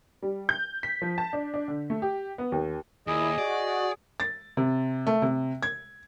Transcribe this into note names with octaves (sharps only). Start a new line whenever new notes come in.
G3
G6
B6
F3
A5
D4
D4
D3
A3
G4
B3
D#2
D#2 A#2 E4 G#4 D#5
F#4 D5
A6
C3
A3
C3
G#6